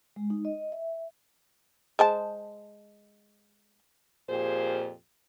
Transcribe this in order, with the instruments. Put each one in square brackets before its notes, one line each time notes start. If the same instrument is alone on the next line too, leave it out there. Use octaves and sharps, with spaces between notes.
[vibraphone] G#3
D#4
D#5
E5
[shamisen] G#3 C5 A5
[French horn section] F2 A#2 G4 G#4 C5